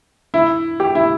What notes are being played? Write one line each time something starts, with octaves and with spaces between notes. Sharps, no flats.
E4
G4
E4